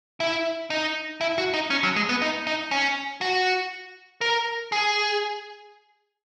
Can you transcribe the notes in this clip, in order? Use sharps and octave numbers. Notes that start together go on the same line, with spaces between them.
E4
D#4
E4
F#4
D#4
C#4
F#3
G#3
B3
D#4
D#4
C#4
F#4
A#4
G#4